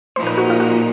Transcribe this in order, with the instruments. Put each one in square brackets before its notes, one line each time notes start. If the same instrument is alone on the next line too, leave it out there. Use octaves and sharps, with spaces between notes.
[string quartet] A#2 F3 A#3 D#4 [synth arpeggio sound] C5
[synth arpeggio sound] B4
F#4
F4
F#4